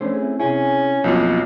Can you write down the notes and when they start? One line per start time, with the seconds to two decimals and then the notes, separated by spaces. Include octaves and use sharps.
0.01 F2 A3 C#4 D4 C5
0.13 C4 E4 G#4
0.40 C3 C#4 E4 G#4
1.04 B1 F2 F3 F#3 A#3 E4